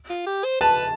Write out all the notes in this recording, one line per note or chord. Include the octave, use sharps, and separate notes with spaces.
F4
G4
C5
B4 A5